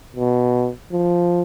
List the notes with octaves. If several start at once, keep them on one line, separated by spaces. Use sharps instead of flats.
B2
F3